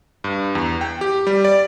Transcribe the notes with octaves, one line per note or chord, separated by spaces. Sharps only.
G2
E2
G5
G4
G3
D5